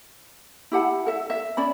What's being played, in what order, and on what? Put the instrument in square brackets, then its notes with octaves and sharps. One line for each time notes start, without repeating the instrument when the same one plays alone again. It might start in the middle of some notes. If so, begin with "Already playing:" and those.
[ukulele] E4 G4 F#5 A5
A4 E5
E5
C#4 D5 B5